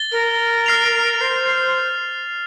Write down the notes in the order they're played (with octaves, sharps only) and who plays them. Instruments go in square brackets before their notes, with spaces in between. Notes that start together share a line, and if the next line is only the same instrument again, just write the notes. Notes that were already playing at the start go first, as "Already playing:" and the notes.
Already playing: [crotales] A6 G7
[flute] A#4
[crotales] F6 C7 F7
[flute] C5